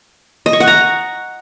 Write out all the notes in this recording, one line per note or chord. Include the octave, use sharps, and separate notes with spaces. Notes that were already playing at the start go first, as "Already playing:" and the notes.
D#5
C#6
F#5
A#5